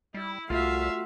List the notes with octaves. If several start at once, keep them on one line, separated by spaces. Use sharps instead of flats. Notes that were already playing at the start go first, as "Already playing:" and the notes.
G3 E4
C2 A3 F4 F#4 E5 F5